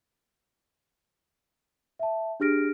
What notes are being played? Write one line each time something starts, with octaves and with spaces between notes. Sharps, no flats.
E5 A5
D4 G4 G#4 F6 A#6 D7